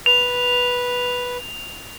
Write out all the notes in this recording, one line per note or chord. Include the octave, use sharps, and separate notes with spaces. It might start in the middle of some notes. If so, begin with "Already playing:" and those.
B4 F7